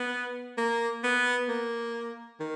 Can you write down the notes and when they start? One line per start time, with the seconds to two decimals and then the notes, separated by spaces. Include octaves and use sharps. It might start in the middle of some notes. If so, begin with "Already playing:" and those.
Already playing: B3
0.58 A#3
1.04 B3
1.48 A#3
2.40 D#3